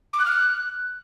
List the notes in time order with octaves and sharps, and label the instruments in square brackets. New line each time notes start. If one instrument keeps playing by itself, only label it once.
[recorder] D6
F#6
F6
F#6